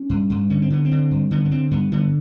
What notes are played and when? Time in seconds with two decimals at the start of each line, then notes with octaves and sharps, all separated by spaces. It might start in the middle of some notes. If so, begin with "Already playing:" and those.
Already playing: C#4
0.10 G2
0.30 G2
0.50 D3 C#4
0.62 C4
0.70 D3 B3
0.85 C4
0.91 D3
1.11 G2
1.31 D3 B3
1.45 B3
1.51 D3 C4
1.71 G2 B3
1.92 D3 B3